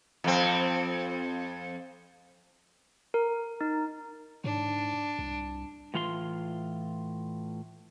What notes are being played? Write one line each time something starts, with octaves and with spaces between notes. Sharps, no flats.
F2 C4
A#4
D#4
G#2 D4
C2
A2 E3 F4 F#5 C6